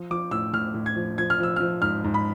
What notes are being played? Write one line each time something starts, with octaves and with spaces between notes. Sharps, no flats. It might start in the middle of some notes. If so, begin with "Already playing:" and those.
Already playing: F3
F3 D6
A2 E6
A2 F6
A2
G#6
F3
F3 G#6
F6
F3 E6
F6
F3
G#2 F6
G#2
B5